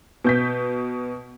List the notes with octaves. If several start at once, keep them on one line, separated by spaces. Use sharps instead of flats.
B2 G6 B6